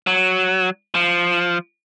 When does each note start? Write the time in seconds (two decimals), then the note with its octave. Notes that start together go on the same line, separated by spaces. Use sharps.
0.07 F#3
0.95 F3